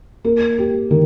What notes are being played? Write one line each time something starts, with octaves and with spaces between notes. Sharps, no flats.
A#3
G4
D#3